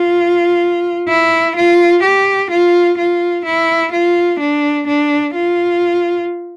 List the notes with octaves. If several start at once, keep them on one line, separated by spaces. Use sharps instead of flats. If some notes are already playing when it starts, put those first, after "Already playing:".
Already playing: F4
E4
F4
G4
F4
F4
E4
F4
D4
D4
F4